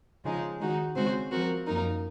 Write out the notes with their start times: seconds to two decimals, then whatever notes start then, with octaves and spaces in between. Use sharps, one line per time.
0.24 C#3 F3 G#3 D#4
0.60 D#3 G#3 D#4 F#4
0.96 C#3 G#3 C4 F#4 C5
1.31 F3 C4 F#4 A#4
1.66 F#2 F3 A#3 D#4 A#4